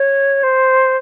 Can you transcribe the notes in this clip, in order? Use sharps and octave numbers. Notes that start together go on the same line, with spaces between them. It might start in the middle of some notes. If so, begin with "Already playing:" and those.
Already playing: C#5
C5